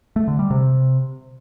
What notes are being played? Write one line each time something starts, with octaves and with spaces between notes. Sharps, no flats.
A3
D3
G3
C3